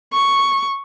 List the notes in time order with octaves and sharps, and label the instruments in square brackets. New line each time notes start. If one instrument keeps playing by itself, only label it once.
[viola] C#6